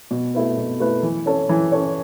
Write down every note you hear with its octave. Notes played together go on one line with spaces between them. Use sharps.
B2
A3 E4 B4
B2
A3 E4 B4
E3
C#4 A4 C#5
E3
C#4 A4 C#5